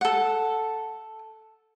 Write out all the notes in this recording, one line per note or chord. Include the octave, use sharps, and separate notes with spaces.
A4 F#5